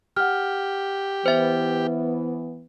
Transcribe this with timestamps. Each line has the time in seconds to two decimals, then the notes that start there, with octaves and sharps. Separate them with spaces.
0.17 G4 F#5 F6
1.26 E3 B3 C5 E5